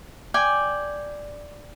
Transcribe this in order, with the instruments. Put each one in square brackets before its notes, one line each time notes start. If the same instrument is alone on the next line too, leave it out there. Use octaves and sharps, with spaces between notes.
[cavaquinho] D5 G5 G#5